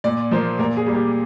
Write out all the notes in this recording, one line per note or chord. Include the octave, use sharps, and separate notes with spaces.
A#2 D5
F3 A#3 C5
A#2 A#4
G#4
G3 A#3
G4